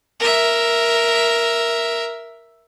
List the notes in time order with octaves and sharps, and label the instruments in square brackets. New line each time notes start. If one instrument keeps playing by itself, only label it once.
[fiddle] A#4 E5